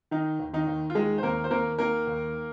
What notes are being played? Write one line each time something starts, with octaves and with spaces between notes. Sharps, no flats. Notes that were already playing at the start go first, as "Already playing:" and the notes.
D#3 D#4
D#2
D#3 D#4
D#2
F4
D#3 G#3 G#4
C5
D#2 A#3 A#4
C5
D#2 A#3 A#4
D#3 A#3 A#4
D#2